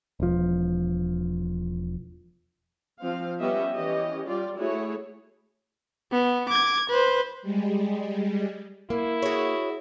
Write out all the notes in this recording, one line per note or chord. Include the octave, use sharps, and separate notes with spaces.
E1 F3
F3 C4 F5
G3 B3 C#4 G4 D#5 E5
E3 C#4 G4 D#5
G3 F4 D5
A3 E4 F#4 G#4 C#5
B3
D6 G#6
B4 C5
G3 G#3
A#3 E4
F#4 G#4 C#5